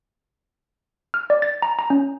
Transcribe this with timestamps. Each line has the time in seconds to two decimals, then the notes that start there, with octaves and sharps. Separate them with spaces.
1.14 F6
1.30 D5
1.42 A6
1.62 A#5
1.79 A#5
1.90 C#4